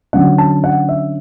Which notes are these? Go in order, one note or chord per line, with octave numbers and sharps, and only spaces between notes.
D3 F#3 C#4 F#5
A5
F#5
E5